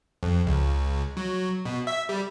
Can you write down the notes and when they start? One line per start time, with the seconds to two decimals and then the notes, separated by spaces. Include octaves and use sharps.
0.23 F2
0.46 C#2
1.17 F#3
1.65 B2
1.87 E5
2.09 G3